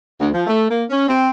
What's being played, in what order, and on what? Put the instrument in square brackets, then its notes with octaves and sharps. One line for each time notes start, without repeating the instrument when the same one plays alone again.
[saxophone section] D2
F3
A3
A#3
C#4
C4